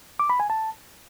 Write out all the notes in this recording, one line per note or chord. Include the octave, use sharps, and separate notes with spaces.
D6
B5
G#5
A5